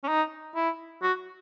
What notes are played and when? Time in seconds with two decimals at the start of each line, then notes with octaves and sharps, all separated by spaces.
0.04 C#4
0.08 D#4
0.55 E4
1.03 F#4